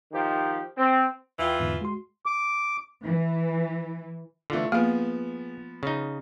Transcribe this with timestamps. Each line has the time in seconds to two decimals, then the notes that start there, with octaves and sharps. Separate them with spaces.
0.12 D#3 F3 D#4 G4
0.77 C4
1.39 D#2 E3 F4 G5
1.60 E2 G#2 D3
1.81 G#3 F#4 C6
2.26 D6
3.04 E3
4.50 D3 E3 A3 F4
4.72 F3 A#3 B3 G#4
5.83 C#3 D#4